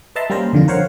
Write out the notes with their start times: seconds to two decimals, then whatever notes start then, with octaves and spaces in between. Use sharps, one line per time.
0.16 B4 D#5 E5 A5 A#5 C6
0.30 G3 A#3 C#4 A#4 C5 A#5
0.53 F2 D3 D#3 F4
0.68 A#4 C5 C#5 F5 F#5